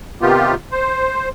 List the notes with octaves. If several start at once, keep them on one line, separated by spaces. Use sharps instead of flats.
C3 D#3 B3 F4 G4
C5